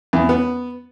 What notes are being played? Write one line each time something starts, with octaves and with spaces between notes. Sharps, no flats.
E2
B3